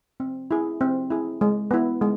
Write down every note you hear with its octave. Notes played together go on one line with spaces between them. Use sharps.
C4
E4 G#4
C4
E4 G#4
G#3
B3 E4
G#3